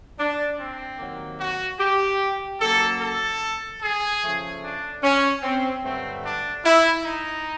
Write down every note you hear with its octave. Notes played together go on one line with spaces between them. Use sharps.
D4
C4
C3 D#3 F#3 A#3
F#4
G4
C#3 F#3 A#3 A4
A4
G#4
C#3 F3 A3
D4
C#4
C4
G2 D3 F#3 A3 C4
D4
E4
D#4